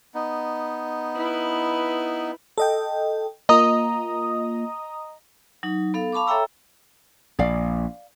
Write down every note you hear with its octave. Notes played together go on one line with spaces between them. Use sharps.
B3 D#4
E4 B4
A4 D#5 G5
A#3 F4 D#5 A#5 D#6
F#3 D#4
B3 A4 F5
F5 A5 B5 C#6 D6
A4 C#5 E5 G5 A#5 E6
A#1 D5 F5